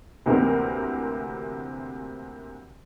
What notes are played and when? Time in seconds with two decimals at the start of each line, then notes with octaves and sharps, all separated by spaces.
0.26 D2 C3 E3 A#3 C4 A#4